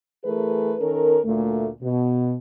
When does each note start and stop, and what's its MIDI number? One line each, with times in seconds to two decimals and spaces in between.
0.25 0.74 52
0.25 0.74 57
0.25 0.74 68
0.25 0.74 70
0.25 0.74 71
0.79 1.19 51
0.79 1.19 61
0.79 1.19 69
0.79 1.19 70
1.25 1.69 38
1.25 1.69 46
1.25 1.69 57
1.82 2.33 47